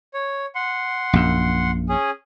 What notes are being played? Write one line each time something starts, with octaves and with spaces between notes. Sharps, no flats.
C#5
F#5 C6
A#1 F#2
C#4 G#4